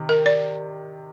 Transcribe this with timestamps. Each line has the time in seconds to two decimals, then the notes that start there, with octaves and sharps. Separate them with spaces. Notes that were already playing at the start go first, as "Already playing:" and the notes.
Already playing: C3 D#3
0.09 A#4
0.26 D5